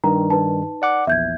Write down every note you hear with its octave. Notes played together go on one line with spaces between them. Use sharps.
G2 D#3 A#5
D#4 B4 A5
D5 F#5 D6
A#1 E2 E5 G6 G#6